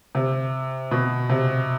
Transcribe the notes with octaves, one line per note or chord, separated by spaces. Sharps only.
C3
B2
C3